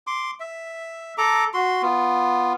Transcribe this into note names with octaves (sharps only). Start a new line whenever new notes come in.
C6 D6
E5
A4 A#5 D6
F#4 C6
B3 F4